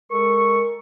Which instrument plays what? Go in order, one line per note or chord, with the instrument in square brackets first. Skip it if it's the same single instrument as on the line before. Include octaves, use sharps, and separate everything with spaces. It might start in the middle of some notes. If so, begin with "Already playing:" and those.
[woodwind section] G#3 A4 C#6 [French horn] A#4